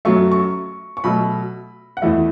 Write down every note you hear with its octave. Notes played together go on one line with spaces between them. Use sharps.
F#2 F#3 A3 C#6
C#6
C#6
B2 F#3 A3 B5
F#5
E2 E3 A3 E5